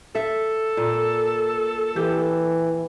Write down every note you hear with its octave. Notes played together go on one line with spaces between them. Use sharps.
A4 E5
A#2
E3 G4